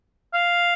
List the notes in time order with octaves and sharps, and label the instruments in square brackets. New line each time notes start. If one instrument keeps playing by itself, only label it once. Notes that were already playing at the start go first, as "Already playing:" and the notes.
[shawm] F5